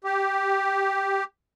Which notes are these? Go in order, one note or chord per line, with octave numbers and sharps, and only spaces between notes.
G4